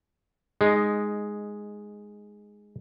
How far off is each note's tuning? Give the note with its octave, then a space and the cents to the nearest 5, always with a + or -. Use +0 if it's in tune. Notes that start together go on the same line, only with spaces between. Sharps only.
G#3 +0 D#4 -10